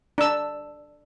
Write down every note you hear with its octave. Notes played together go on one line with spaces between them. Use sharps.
D4 E6